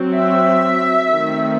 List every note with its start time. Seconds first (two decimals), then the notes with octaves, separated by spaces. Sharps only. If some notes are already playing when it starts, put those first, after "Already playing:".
Already playing: F#3 C4
0.13 E5
1.11 D#3 A3 C4